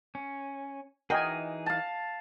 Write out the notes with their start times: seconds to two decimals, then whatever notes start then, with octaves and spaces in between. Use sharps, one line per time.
0.15 C#4
1.10 E3 D#4 F#4 G#4 A#4 D#5 G5 G#5
1.66 F5 A5